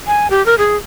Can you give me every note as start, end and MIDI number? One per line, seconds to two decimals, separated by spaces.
0.07 0.27 80
0.30 0.44 67
0.46 0.55 70
0.58 0.76 68